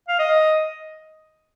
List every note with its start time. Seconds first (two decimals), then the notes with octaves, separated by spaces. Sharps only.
0.08 F5
0.19 D#5